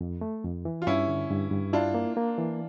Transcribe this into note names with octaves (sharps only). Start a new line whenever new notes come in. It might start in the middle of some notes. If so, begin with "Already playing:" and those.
F2
A3
F2
E3
F4
G2 C#4 E4
D3
G2
G2
D4 E4 F4
A#3
A#3
E3